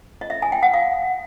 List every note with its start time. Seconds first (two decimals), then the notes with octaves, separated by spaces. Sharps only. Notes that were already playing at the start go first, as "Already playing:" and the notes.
0.21 D#5
0.30 E5
0.42 G#5
0.52 G5
0.63 F#5
0.74 F5